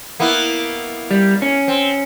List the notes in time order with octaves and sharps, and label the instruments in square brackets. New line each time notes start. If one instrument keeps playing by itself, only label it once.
[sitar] A#3 B3 E4
[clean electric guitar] G3
C#4
[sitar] C4